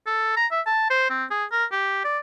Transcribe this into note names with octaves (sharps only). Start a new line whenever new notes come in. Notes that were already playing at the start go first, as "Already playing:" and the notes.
A4
A#5
E5
A5
C5
C4
G#4
A#4
G4
D5